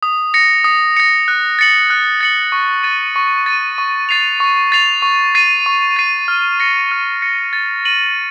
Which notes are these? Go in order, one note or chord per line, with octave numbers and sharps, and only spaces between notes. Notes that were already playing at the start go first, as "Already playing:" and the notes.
D#6
A#6 C#7
D#6
A#6 C#7
F#6
A6 C#7 F#7
F#6
A6 C#7 F#7
C#6
A6 D#7
C#6
A6 D#7
C#6
A6 C7 F7
C#6
A6 C7 F7
C#6
A6 C7 D#7
C#6
A6 C7 D#7
F6
A#6 C#7
F6
A#6 C#7
A6
D#7 F#7